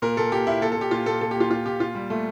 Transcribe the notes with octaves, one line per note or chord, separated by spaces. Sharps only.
A#2 A#4
A#2 A4
A#2 G4
A#2 E4
A#2 A4
A4
A#2 G4
A#2 F4
A#2 A4
A#2 A4
G4
A#2 F4
A#2 F4
A#2 G4
A#2 F4
A#2 G3
A#2 A3